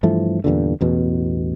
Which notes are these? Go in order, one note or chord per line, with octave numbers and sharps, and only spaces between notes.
G2 E3 F3 A3
E2 G2 A#2 D3
A1 E2 B2